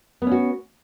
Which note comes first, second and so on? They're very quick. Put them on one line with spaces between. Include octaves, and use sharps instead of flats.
B3 C#4 F#4